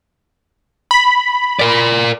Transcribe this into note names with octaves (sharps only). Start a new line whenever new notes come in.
B5
A#4 D5